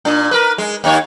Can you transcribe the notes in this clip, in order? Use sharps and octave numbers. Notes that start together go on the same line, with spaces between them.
A#2 D4
A#4 B4
G#3
D#2 D#4 C#5